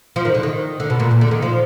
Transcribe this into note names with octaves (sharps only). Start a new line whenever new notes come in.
F3
D#3
D3
D#3
D3
B2
A#2
A#2
D3
D#3
F3